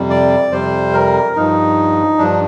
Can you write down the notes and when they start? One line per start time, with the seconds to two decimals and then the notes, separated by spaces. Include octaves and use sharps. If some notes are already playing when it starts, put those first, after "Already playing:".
Already playing: F2 C3 G3
0.10 D5
0.52 F2 C3 G3 C5
0.94 A#4
1.36 G2 F3 D#4
2.18 G2 F3 D4